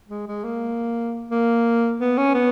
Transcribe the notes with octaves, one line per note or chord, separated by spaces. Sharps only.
G#3
G#3
A#3
A#3
B3
C#4
B3